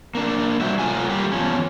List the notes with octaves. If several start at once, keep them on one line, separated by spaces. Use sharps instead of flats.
A#3 D4
G3 F#4 C5 E5
A2 F#3 F4 G#5
G3 A#3 F4 G4
E2 F3 C#4